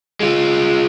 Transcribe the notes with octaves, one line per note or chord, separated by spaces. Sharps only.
G#3 F4